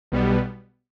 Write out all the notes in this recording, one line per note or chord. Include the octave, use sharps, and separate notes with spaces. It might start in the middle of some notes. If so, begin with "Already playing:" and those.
B1 B2 G3 B3